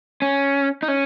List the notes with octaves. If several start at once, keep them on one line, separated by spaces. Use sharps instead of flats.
C#4
D#4
C#4